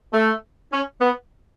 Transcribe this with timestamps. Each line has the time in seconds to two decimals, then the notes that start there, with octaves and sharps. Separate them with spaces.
0.14 A3
0.72 C#4
1.01 B3